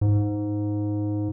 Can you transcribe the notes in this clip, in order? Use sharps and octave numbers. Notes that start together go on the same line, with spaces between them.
G#2